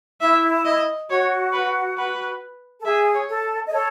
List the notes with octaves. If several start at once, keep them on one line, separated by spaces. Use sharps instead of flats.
E4 E5
D#5
F#4 C#5
B4
B4
A4
G#4 E5
C#5
A4
D#5
A4 C#5